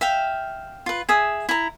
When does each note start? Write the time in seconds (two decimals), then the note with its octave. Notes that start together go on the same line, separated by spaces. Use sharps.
0.01 E5 F5 G5
0.86 F4 B4
1.09 G#4 E5 D#6
1.49 E4 A#5